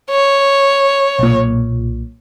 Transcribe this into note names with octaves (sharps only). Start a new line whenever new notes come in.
C#5
B1 A#2